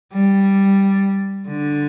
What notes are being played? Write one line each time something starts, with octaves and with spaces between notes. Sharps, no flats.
G3
D3